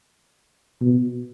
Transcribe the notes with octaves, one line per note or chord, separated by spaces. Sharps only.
B2